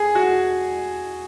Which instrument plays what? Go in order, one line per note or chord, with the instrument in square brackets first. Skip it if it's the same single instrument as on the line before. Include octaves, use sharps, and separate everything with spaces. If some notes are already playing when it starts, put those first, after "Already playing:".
Already playing: [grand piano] G#4
F#4